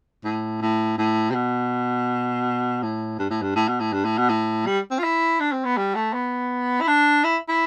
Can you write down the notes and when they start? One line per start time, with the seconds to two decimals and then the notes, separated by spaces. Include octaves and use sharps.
0.24 A2
0.61 A2
0.98 A2
1.30 C3
1.35 B2
2.83 A2
3.19 G2
3.30 A2
3.42 G2
3.56 A2
3.68 B2
3.80 A2
3.93 G2
4.05 A2
4.18 B2
4.29 A2
4.66 G3
4.91 C4
4.99 F4
5.04 E4
5.40 D4
5.52 C4
5.65 B3
5.77 G3
5.95 A3
6.13 B3
6.81 E4
6.88 D4
7.24 E4
7.48 E4